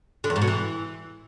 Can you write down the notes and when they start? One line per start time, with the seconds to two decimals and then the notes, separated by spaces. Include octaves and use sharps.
0.24 D3
0.30 E2
0.36 G#2
0.42 B2
0.47 E3